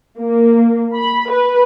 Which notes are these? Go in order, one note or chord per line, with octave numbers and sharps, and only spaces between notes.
A#3
B5
B4